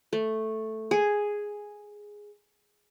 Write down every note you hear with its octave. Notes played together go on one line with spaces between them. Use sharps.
A3
G#4